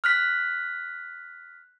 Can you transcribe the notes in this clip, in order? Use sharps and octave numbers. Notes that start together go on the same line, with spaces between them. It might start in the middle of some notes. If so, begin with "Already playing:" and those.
F6 F#6 B6